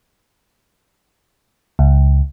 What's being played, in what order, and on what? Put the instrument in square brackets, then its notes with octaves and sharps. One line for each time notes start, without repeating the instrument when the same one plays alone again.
[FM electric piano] C#2